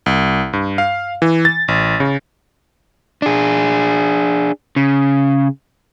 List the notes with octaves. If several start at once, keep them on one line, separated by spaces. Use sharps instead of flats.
C2
G2
F5
E3
A6
A1
C#3
D4 G#4
C#3